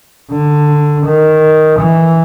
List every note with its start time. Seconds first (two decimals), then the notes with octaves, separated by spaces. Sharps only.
0.31 D3
1.06 D#3
1.79 E3